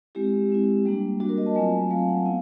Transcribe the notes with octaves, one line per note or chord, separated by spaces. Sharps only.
G#3 C4 E4 G4
G#3 C4 E4
G3 A#3 D4
G3 A#3 D4 F#4
A#4
D#5
A5
F#3 A3 C4 F4 G#5
F#3 A3 C4 F4 F5
F#5
B3 E4 F5